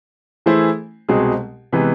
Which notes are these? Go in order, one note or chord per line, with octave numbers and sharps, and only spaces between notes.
E3 A3 E4 G#4 C5
C2 B2 G#3 C4 G#4
C3 E3 G#3 B3